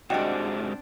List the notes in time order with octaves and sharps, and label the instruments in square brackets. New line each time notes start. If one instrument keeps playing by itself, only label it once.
[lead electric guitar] C2 G#2 [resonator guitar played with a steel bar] G3 F#4 [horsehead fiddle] C4 D4 [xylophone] D#5 G5